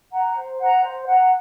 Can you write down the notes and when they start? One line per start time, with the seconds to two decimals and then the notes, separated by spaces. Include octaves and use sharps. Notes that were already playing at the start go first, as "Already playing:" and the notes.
0.11 F#5 A#5
0.35 C5
0.59 F#5 A#5
0.82 C5
1.06 F#5 A#5